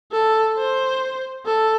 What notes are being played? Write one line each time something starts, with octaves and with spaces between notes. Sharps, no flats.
A4
C5
A4